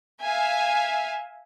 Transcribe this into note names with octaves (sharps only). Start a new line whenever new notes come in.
E5 F5 G#5